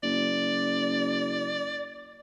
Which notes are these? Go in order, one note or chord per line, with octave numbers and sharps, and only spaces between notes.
F#1 D5